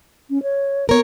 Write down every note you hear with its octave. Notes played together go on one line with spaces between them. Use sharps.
C#4
C#5
B3 A#4 C#5